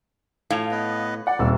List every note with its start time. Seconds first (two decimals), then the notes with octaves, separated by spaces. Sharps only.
0.50 A2 F5 G#6 F7
0.71 B3 B4 D#5
1.27 D5 F#5
1.39 D#1 C3 A#3 E6